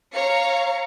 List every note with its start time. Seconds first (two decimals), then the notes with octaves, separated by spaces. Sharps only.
0.13 C#5 F5 A#5 C#7